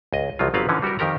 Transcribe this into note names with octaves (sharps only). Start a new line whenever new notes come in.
C#2 D#5
C2 F3 F#3 F4
G1 F#3 B3 C4 B4 F5
D3 E3 F3 C#4
G3 F#4 G4 A#4
F2 D#3 G4 A#4 A#5